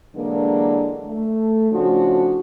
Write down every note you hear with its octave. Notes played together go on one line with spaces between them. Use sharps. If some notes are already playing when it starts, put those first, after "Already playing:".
D3 E3 F#3 G#3 A#3 D4
A3
A2 C#3 F3 D4 F#4